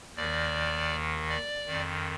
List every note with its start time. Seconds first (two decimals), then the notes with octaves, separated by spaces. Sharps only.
0.16 D#2 D#3 D5
1.29 D5
1.66 F2 D#3